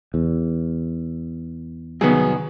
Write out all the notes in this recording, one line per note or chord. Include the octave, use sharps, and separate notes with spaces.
E2
C2 D#3 F#3 B3 G#4